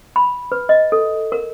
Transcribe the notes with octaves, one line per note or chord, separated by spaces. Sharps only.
B5
B4
D#5
A4
A#4